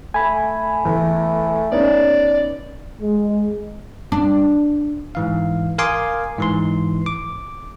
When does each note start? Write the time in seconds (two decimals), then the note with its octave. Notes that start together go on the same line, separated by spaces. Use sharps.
0.14 A3 G#5 B5
0.85 E2 A3
1.72 B3 C#4 D#4 D5
3.01 G#3
4.12 D4
5.15 G#2 E3 F5
5.78 A#4 F5 G#5 C6 D6 D#6
6.38 G#2 E3 C6
7.06 D6